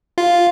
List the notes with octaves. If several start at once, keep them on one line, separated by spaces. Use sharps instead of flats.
F4